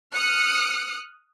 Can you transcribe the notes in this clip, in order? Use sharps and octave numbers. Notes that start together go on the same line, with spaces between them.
D#6 F6 F#6 C#7